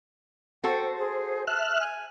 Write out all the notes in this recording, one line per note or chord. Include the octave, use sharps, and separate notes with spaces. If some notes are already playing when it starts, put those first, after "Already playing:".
F#4 A4 C5 G5
G#4
E5 A5 F6 F#6
G#5